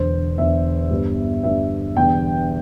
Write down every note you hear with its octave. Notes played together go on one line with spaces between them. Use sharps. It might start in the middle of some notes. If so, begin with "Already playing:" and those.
Already playing: E1 E2 D3 C5
E1 E2 D3 E5
G1 G2 G3
G1 G2 G3 E5
E1 E2 D3 G3 G5